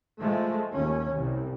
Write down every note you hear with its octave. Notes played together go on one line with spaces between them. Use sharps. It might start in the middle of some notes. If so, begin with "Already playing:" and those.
F3 G#3 A3
D#2 C#4
C2